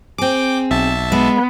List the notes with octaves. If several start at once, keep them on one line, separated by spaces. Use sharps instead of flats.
C4 G#4 G5 D6
B1 E5 A5
G#3 B3